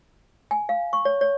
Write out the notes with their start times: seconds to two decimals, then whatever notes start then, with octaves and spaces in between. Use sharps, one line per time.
0.51 G#5
0.69 F5
0.93 C#6
1.05 C#5
1.21 C#5